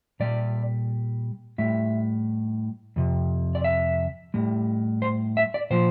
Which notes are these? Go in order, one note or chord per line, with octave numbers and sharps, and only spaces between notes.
A#2 G3 D5
A2 G3 E5
F2 C3
D5
E5
A2 G3
C5
E5
D5
A#2 F3 C5